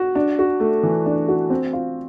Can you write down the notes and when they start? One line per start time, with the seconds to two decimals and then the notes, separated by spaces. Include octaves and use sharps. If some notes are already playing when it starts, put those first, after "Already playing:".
Already playing: F#4
0.15 D4
0.39 F#4
0.60 A3
0.83 E3
1.06 D4
1.28 F#4
1.50 C4
1.73 F4